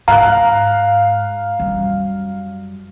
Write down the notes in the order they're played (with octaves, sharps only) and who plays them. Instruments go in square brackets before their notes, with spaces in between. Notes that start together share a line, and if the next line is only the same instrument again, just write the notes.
[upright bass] G#2 [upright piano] F5 F#6 [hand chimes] A#5
[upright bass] F#2 G3